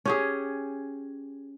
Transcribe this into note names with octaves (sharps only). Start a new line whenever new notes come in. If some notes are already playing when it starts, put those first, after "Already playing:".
C#4 G4 G#4